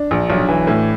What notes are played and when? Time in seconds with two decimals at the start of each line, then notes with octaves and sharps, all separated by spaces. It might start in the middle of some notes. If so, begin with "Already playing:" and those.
Already playing: D4
0.11 A#1
0.30 B1
0.49 E3
0.67 A2